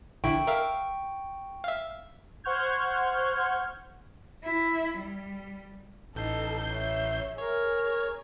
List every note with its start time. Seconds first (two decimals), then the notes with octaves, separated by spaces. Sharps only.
0.24 A#1 D3 E4 G5 C#6 D7
0.47 A#4 E5 F5
1.64 E5 F5
2.44 C5 F#5 C#6 F6 G6 G#6
4.44 E4
4.97 G3
6.15 A1 D#4 A4 G6 C7
6.70 C#5 E5
7.38 G#4 A#4 C#5